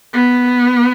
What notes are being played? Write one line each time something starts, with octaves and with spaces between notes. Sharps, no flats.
B3